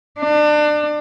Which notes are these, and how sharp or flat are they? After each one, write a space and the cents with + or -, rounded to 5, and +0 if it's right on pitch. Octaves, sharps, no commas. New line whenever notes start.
D4 +30